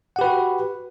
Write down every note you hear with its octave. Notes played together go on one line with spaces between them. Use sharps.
F#4 G4 B4 F#5